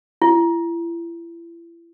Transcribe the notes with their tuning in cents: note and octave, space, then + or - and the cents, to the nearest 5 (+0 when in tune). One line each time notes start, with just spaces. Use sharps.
E4 +35